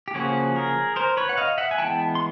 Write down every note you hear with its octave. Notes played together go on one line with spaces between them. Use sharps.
G4
C#3 F3 A#3 C#4 F#4 G#4
G#4 A#4
A#4 C5
B4 C#5
F#5
D#5 F5
E5 F#5
G#5
E3 G#3 B3 G5 A5
C6